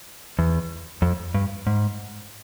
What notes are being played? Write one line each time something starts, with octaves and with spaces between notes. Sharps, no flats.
E2
F2
G2
G#2